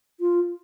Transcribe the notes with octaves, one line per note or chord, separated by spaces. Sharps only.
F4